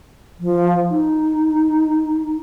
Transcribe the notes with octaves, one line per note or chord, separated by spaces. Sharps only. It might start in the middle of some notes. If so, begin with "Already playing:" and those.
F3
D#4